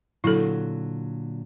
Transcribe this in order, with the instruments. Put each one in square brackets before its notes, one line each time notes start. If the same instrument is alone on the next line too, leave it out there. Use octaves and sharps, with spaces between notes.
[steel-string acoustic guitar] A#2 D3 F#3 [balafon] E4 A4